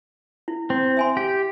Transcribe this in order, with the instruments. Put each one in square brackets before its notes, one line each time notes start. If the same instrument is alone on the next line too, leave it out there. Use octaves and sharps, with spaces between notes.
[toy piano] E4
[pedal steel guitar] C4
[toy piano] E5 G#5 C6
[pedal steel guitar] G4